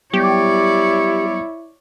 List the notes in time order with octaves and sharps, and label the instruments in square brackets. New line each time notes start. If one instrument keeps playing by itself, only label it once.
[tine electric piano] F#3 G3 B3 [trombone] E4 [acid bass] G4 [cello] C#5 D5